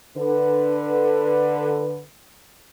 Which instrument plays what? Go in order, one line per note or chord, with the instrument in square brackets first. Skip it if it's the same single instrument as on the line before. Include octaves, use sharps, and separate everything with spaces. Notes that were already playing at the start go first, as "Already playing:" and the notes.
[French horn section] D3 B4